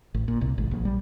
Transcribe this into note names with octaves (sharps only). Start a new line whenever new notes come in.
A1
A#2
C2
G#1
A#1
G3